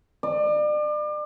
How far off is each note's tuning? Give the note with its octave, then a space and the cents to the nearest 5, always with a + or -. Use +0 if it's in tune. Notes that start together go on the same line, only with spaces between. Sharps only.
D5 +35